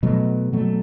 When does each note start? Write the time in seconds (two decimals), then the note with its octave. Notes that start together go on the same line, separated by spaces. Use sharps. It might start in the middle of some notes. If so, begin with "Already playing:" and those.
0.03 B2 F#3 A3
0.52 B2 F#3 A3